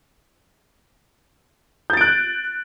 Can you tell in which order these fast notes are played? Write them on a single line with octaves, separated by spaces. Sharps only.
G6 A6 D7 F#6